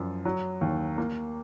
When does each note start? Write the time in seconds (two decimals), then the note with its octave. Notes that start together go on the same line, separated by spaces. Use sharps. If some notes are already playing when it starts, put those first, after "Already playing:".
Already playing: F#2 F3
0.25 F#3
0.61 D#2
0.98 A#3